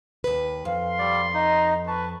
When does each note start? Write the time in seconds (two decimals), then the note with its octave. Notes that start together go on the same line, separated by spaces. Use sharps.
0.24 D#2 B4
0.65 F2 F5 C6
0.99 G3 D5
1.34 D#4 D#5 A#5 D#6
1.87 B4 A5 C#6